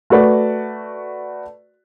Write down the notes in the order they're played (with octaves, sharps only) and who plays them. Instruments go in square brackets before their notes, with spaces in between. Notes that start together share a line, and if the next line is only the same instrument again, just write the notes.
[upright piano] A3 F#4 B4 D5